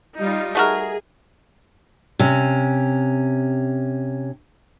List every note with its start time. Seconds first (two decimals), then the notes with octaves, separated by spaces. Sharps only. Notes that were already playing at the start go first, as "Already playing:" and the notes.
0.17 G3 D#4 F4
0.55 A3 F#4 G#4 A#4
2.19 C3 C#4